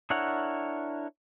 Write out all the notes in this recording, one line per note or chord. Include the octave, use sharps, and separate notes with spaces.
D4 E4 A#4 C#5 F#5